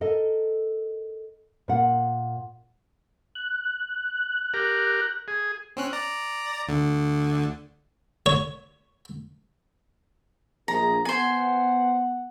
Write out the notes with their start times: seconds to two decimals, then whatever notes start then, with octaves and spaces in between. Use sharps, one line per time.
0.01 A4 A#4 D#5
1.68 A#2 F#5
3.35 F#6
4.54 G4 A#4
5.28 G#4
5.77 C4 C#4 F#6
5.93 D5 A#5
6.68 D2 D3
8.26 C#5
10.68 A#1 G#4 A#5
11.05 B3 C5 F#5 G#5